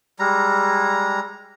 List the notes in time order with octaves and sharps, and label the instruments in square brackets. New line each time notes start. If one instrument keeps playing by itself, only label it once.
[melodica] G3 G#3 A#5